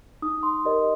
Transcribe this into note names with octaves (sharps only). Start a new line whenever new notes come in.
D#4 D#6
C6
G4 A#4 D5 D#5